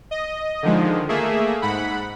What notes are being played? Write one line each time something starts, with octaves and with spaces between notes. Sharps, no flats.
D#5
D3 D#3 F3 G#3
A3 A#3 G#4 E5
G#2 F#5 B5